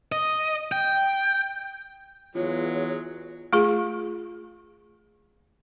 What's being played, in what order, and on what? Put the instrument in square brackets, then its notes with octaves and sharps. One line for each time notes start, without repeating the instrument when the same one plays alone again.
[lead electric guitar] D#5
G5
[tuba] E2 [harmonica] F#3 G#3 [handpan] F4 [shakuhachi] C#5
[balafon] A3 F4 G#4